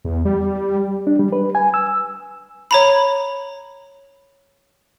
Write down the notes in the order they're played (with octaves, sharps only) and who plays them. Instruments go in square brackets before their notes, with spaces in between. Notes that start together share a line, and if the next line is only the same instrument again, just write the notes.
[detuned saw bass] E2
G3
[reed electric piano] D4
G3
B4
G#5
E6
[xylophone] C#5 A#5 B5